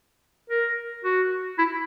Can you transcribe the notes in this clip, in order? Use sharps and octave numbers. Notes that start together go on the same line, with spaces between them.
A#4
F#4
E4